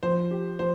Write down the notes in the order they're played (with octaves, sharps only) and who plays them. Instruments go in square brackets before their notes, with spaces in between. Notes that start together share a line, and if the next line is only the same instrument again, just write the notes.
[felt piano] F3 [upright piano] C5
[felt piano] G4
[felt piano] F3 [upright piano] C5